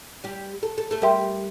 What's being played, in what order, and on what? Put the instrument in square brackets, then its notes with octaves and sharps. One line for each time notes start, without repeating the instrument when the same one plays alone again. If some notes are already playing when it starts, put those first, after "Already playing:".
[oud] G3 G4
A4
A4
A3 A4
[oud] G3 G4 [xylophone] A#4 E5 G5 C6